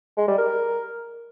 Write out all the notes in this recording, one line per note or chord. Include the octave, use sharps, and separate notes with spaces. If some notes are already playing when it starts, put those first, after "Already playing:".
G#3
G3
A#4